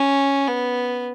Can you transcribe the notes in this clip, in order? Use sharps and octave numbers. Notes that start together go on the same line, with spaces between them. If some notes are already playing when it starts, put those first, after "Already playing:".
Already playing: C#4
B3